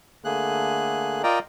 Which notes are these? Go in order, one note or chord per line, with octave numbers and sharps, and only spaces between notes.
D3 A3 A#3 G#4 F#6
F4 A#4 D5 D#5 G5 A#5